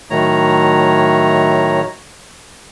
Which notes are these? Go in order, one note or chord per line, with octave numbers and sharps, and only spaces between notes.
A2 D#3 F#3 A3 C#5 A#5